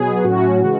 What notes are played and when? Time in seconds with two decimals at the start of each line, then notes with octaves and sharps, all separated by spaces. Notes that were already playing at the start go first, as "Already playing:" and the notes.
Already playing: B2 F#3 B3 G#4
0.24 A2 F#3 C#4 F#4
0.62 C#3 E3 G#3